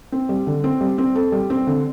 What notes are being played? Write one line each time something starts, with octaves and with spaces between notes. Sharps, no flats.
C4
G3
D3
C4
G3
C4
A4
G3
C4
D3